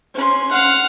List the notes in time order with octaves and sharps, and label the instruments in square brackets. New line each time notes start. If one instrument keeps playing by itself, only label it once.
[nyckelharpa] C#4 C6
F5 F#5